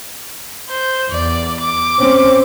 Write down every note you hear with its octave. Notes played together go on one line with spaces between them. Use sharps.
C5
E2 D5
D6
C4 C#4